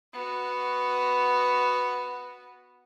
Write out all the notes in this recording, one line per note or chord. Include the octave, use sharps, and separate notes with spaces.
B3 F#4